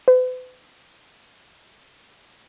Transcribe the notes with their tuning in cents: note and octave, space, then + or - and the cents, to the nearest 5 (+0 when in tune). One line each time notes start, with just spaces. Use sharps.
B4 +45